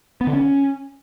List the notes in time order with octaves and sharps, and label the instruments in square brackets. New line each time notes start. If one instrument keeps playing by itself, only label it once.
[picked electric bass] B3
D3
C#4